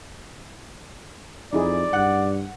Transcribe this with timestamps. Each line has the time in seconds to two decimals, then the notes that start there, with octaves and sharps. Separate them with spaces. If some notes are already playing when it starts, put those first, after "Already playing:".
1.53 F2 D#4 E4 G#4 D5
1.93 G2 F#5